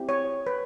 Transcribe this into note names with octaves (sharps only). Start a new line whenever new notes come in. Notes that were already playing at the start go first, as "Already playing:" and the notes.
Already playing: C4 E4 G4
C#5
B4